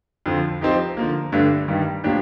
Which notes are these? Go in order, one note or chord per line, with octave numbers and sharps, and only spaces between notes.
F2 D3 F3
F3 C4 D#4 G4
D3 F3 A#3
G2 D3 A3 D4
G2 D#3 G3
A2 F3 A#3 D4 G4